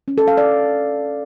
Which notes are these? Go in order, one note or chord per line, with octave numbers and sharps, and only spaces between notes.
C#4
A4
F5
D5